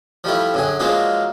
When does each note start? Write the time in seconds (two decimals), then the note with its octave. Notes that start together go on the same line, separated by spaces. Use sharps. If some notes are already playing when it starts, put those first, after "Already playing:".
0.24 F3 G3 A3 E4
0.54 F#2 D3 G#4
0.79 F3 F#3 G#3 A#3 D4 D#4